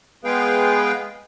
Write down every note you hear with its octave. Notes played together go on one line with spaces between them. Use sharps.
G#3 B3 G#4 B4 F5 G5